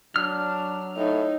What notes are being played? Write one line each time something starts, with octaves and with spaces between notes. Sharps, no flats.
F#3 D4 F6
A2 D#4